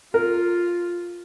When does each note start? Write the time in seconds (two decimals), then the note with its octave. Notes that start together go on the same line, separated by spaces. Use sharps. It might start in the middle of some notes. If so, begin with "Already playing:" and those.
0.14 F4 A#4